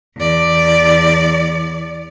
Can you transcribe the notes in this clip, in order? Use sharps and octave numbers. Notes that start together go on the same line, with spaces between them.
E2 D5